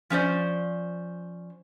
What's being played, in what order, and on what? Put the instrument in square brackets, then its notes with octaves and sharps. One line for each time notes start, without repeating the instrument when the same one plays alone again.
[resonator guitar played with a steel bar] F3 C#4 C5 D5